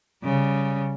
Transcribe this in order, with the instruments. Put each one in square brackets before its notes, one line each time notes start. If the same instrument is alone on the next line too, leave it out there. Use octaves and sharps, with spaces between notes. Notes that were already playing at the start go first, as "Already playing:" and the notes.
[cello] C#3 G3